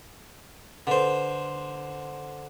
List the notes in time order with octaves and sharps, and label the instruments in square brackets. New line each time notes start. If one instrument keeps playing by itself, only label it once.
[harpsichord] D3 C5 [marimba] A4 B4